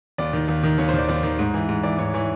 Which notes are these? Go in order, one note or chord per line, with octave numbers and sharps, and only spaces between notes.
D#2 D5
D#3
D#2
D#3
D#2 C#5
C5
D#3 D5
D#2 D5
D#3
G#2
E3
G#2
E3 D5
G#2 C#5
E3 C#5